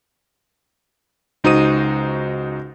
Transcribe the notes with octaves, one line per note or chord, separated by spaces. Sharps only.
C#2 D#4 F#4 C5 D#6 D#7